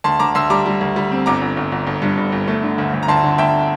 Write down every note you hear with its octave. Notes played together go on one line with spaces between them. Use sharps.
D2 A5 C6
D2 A#5 D6
D2 C6 E6
G3 A#5 D6
G3
D2
G3
C4
G1 A#5 D6
G1
G1
G1
G1
G2
G1
G1
A3
D3
D2
D2
A#5
D2 A5 C6
D3
D2 E5 G5